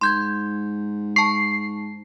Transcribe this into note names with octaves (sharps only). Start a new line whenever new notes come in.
G#2 C6 G6 G#6
A5 C#6 C7